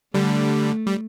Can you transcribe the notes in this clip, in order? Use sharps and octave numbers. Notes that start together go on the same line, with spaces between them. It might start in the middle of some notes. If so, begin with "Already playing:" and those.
D3 G3 A3
G3